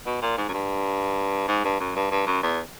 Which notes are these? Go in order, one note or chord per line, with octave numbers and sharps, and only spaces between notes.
B2
A#2
G#2
F#2
G2
G#2
G2
F#2
G2
G2
F#2
E2